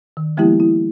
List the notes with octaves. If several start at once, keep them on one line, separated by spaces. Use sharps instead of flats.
D#3
F3 G#3 A#3 B3 E4 G4
E4